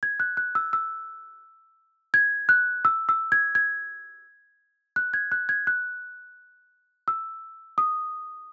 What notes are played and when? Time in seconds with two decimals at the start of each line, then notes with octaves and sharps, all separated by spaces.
0.03 G#6
0.20 F#6
0.37 F#6
0.55 E6
0.73 E6
2.14 G#6
2.49 F#6
2.85 E6
3.09 E6
3.32 G#6
3.55 G#6
4.96 F#6
5.14 G#6
5.32 F#6
5.49 G#6
5.67 F#6
7.08 E6
7.78 D#6